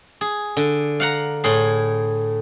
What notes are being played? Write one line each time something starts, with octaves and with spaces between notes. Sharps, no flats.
G#4
D3
F5 F#5 A#5
A2 G#4 C6